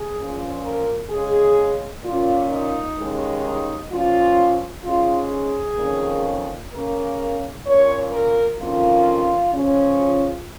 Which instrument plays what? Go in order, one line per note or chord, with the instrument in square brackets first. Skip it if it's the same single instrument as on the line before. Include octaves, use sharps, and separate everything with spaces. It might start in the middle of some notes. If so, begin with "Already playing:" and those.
Already playing: [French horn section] G#4
A#2 F3 C#4
A#4
C#3 G#3 C#4 G#4
A#2 A#3 C#4 F4
D#4
D#2 D#3 G#3 C#4
D#4
A#2 F3 C#4 F4
G#2 G#3 C#4 F4
G#4
F2 D#3 A#3 C#4
C#3 A#3 C#4 A#4
A#2 A#3 C#4 C#5
A#4
F2 D#3 A#3 C#4 F4
C#3 F3 C#4
F4